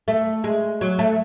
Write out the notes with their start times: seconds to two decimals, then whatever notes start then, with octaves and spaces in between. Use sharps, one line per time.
0.08 A3
0.44 G#3
0.81 F#3
0.99 A3